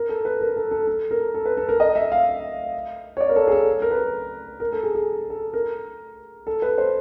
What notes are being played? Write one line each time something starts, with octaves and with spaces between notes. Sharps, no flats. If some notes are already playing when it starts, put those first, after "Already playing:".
Already playing: A#4
A4
B4
A#4
A4
A4
A4
A#4
A4
B4
A4
A#4
D#5
E5
F5
C#5
D5
A#4
A4
G#4
A4
A#4
B4
A#4
A4
G#4
G#4
A4
A#4
A4
B4
C5